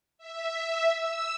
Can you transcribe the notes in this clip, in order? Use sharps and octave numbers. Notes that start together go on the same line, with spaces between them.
E5
E6